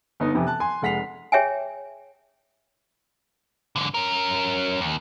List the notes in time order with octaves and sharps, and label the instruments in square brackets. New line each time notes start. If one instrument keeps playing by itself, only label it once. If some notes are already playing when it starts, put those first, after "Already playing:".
[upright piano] G1 B3 D#4
F2 C3 E3
A5 F#6
G#5 C6
F1 G#3 F#5 B6 C7 F7
[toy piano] G#4 C#5 E5 G5 G#5
[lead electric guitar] G#2 D3
C#4 A#4
D#2